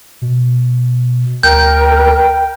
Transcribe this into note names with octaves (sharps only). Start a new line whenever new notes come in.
B2
D2 A#4 G5 G6